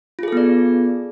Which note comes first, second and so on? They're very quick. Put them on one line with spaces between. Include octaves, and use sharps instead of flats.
F4 G#4 A4 B3 D5